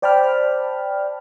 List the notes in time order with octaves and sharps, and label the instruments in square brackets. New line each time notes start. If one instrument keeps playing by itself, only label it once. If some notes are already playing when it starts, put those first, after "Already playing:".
[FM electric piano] C5 D5 G5 A5 B5 F6